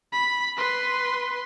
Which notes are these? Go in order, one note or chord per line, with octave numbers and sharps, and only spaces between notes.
B5
B4 C6